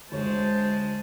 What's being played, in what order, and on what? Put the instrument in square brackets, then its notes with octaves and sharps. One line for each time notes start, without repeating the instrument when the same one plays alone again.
[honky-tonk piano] D2 C#5 [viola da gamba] G#3 [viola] C5 A5